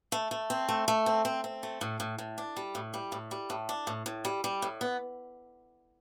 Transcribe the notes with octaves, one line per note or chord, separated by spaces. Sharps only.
A3
A3
C4
A3
A3
C4
C4
C4
A3
A2
A2
A2
D4
G3
A2
G3
A2
G3
A2
D4
A2
A2
G3
G3
A2
B3